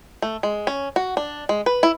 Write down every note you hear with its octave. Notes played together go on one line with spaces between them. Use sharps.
A3
G#3
C#4
F#4
D4
G#3
B4
E4